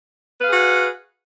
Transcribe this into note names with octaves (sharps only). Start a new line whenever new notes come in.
F#4 G#4 B4 F5